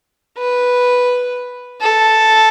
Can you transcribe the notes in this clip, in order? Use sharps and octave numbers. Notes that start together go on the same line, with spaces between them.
B4
A4